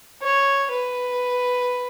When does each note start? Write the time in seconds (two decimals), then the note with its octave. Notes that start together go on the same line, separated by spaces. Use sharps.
0.23 C#5
0.71 B4